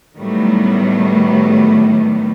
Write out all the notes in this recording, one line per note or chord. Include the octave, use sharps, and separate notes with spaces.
A2 D#3 F#3 G3 A3 B3